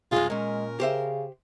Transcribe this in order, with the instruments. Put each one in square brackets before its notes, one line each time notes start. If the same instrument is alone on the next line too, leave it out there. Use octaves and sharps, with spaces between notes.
[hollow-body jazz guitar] C2 F#2 G#3 [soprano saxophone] F4 [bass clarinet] G#4
[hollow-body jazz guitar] A#2 C#4 [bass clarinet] G#3 [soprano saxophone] A#4
[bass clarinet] C#3 [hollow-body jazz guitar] G4 C5 E5